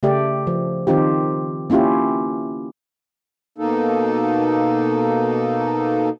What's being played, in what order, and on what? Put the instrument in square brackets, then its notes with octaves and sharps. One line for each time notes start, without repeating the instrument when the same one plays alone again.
[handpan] C#3 A3 G4 D5
F3
D#3 C4 D#4 F4 G4
A#3 C#4 E4 F4 G4
[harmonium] B2 A#3 D#4 A4